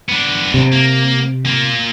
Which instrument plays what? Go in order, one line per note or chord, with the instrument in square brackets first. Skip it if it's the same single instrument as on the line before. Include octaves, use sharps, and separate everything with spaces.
[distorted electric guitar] B3 D4
[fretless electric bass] C3
[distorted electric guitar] A#3
A#3 F4